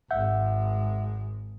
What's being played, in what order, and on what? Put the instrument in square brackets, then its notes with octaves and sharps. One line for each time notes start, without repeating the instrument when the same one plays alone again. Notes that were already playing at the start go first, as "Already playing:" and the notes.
[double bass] G#1 G#3 [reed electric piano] E5 F#5 G6